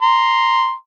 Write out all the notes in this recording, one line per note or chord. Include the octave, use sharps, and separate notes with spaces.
A#5 C6